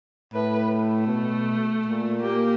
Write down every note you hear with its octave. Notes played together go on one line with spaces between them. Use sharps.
A2 B4
A3
B2
A#2
A#3 G4